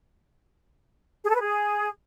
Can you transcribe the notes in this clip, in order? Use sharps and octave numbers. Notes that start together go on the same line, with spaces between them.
G#4
A4
B4
G#4